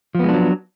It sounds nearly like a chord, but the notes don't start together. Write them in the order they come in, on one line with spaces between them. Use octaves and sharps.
F3 B3 G#3 D4 F#3